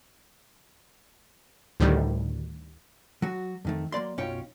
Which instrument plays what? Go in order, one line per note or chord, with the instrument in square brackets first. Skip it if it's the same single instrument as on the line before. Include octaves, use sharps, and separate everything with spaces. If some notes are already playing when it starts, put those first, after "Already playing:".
[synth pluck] D2 A2 D#3 G3
[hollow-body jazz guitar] F#3 F#4
F2 D#3 A3
F#3 A#3 D5 C6
B1 F#2 C#4 F4 C#5 G5